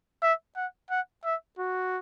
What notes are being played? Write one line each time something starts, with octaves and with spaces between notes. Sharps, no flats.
E5
F#5
F#5
E5
F#4